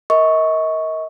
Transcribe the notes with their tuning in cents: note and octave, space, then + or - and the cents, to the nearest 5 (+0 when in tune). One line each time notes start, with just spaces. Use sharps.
A#4 +0 D#5 +40 C#6 +0